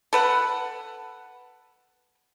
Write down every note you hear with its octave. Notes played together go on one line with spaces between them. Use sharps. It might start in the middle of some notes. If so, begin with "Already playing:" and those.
A4 B4 F#5